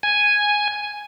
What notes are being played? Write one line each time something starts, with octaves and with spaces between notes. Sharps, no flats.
G#5